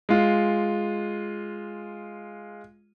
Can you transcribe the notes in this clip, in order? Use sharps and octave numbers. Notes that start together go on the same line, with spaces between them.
G#3 F4